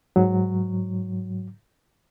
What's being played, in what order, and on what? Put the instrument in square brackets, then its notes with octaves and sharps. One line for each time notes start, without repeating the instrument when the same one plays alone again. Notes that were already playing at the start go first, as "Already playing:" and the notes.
[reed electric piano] G#2 F#3